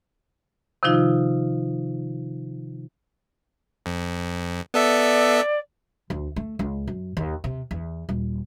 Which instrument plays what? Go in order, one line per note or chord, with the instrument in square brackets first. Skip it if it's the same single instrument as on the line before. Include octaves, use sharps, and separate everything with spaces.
[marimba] C3 D#3 F3 D#4 F4
[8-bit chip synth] F2
[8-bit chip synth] B3 A4 E5 [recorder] D5
[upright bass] D2
A3
C#2
F#2
D#2
C3
E2
D#1